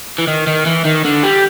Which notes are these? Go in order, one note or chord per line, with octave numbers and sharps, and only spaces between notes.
E3
D#3
D#3
E3
D#3
D3
G3